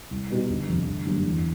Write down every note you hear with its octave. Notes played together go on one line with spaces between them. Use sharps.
C2
B2 G3 B3 D#4
G1
F2 C3
G1
F#2 D3 G3 A#3
E2